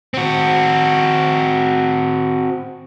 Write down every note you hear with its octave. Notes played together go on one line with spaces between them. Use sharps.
C4 F#4